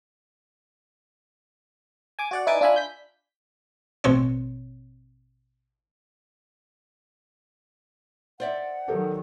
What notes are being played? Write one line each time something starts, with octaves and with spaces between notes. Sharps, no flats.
G#5 D6
F#4 D5 F#5
D#4 E4 B4 D5 G#5 D6
D4 F4 E5 G#5 B5
G6 B6
A1 B2 C4 C#5
C5 D5 E5 F#5
D#3 F#3 G4 A4 A#4